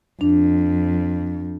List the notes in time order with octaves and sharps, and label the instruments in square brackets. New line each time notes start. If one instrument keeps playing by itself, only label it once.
[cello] F2 [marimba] D4